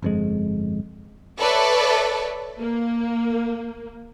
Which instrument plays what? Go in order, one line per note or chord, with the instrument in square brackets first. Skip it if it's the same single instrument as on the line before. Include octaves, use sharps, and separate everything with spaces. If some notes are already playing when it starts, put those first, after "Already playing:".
[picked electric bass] G1 F2 G#3
[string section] A4 B4 C#5 D5 E5
A#3